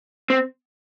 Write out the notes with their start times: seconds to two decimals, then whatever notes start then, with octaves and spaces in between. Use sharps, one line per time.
0.30 C4